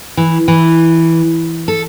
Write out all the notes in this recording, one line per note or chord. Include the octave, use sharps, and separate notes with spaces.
E3
E3
A4